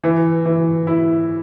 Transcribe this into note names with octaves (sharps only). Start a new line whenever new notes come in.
E3
E3
E4